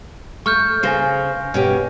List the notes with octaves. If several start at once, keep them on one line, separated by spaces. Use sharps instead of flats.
A3 C#6 F6 G6
C#3 C5 G#5 A#6 C7
B2 C#4 G4